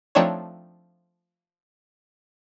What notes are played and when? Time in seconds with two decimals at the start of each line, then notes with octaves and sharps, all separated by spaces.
0.15 F3 A3 C4 D4 D#4 C#5